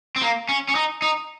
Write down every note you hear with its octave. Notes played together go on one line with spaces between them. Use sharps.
C4
A#3
C#4
C#4
D#4
D#4